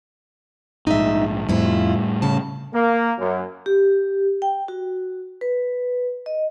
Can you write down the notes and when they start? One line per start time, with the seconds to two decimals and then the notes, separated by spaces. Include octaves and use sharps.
0.87 A#1 G#2 D#4 E5
1.49 F2 A2 G3 E4 F4
2.22 C#3 A5
2.74 A#3
3.18 F#2
3.66 G4
4.42 G5
4.68 F#4
5.41 B4
6.26 D#5